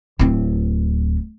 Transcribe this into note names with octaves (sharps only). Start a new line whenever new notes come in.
D1 C4